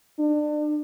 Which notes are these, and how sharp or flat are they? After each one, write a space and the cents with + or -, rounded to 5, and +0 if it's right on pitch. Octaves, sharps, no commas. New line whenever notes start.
D4 +30